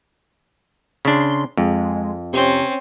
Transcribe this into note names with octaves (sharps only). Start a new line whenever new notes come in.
C#3 D4 C6
F2 G#3
C3 C4 C#4